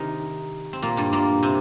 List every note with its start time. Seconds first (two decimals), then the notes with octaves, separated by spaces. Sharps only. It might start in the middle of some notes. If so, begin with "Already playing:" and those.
Already playing: C3 D#3 C4 D#4
0.73 C4
0.82 A#2 A#3
0.97 G2 G3
1.13 A#2 A#3
1.43 C3 C4